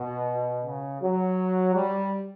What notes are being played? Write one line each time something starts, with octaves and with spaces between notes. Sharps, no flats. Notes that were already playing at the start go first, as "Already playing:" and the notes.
Already playing: B2
C#3
F#3
G3